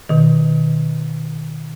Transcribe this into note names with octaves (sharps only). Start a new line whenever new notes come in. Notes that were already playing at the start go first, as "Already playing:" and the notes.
B2 D#3